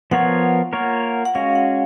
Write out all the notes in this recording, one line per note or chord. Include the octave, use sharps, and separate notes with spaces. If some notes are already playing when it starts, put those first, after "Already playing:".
F3 B3 F4 A#4 C#5 F#5
A#3 F4 A#4 C#5
F#5
G#3 C#4 F#4 F5
F#5